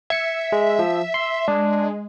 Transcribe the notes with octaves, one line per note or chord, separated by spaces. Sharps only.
E5 G#6 C#7
G#3
F3
C6
G#3 D4